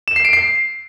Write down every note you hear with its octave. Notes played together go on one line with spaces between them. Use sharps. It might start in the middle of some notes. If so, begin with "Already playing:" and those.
E7
C7
D7
C7